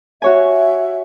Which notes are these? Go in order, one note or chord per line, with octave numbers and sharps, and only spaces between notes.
F#4 C#5 E5 G#5